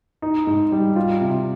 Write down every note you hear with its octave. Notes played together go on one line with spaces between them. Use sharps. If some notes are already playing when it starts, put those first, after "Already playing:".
D#4
G#2
G3
F4
C3